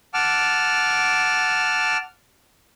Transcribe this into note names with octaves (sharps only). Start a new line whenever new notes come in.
F#5 A5 D6 F6